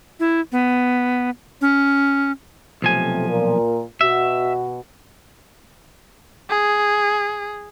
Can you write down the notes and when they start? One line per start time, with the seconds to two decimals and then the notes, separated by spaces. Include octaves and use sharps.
0.20 E4
0.52 B3
1.61 C#4
2.82 B1 C3 F3 A3 G#5
3.28 A#2 A#4
4.01 B2 F#4 E5
6.50 G#4